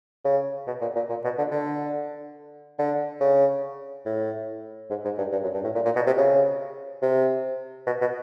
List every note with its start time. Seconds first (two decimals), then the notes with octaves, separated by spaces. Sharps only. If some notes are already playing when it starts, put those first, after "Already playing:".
0.25 C#3
0.67 B2
0.81 A#2
0.96 A#2
1.10 A#2
1.25 B2
1.38 D3
1.52 D3
2.79 D3
3.21 C#3
4.06 A2
4.90 G#2
5.05 G#2
5.18 G2
5.32 G2
5.44 F#2
5.54 G2
5.64 A2
5.75 A#2
5.85 A#2
5.96 B2
6.07 C3
6.18 C#3
7.02 C3
7.87 B2
8.01 B2